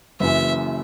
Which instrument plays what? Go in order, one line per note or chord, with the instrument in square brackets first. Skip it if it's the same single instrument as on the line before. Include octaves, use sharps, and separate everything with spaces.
[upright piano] F#1 F#2 E3 [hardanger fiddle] E5